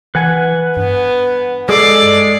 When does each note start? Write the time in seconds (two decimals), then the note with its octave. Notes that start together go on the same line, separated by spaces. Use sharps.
0.15 E3 B4 F#5 G#5
0.77 G2 B3
1.69 G#3 G#4 A4 D5 C7